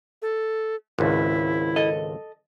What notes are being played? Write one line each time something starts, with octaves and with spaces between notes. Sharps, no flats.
A4
G#1 C#2 E4
A4 D#5